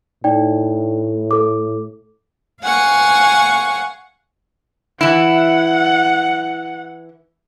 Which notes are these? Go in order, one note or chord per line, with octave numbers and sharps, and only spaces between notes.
A2 D#4 D5 G5
A4 D6
F5 F#5 G#5 C#6
E3 E4 F#5